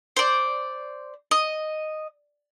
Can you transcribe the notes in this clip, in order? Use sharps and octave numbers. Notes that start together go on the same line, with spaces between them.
C5 D5
D#5